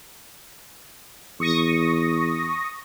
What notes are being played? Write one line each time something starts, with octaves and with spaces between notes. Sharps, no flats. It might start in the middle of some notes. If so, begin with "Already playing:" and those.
E2 C#6 D#6 A#6